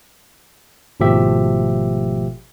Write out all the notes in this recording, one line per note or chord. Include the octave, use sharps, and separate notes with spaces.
G#1 B2 F3 A3 G4 E5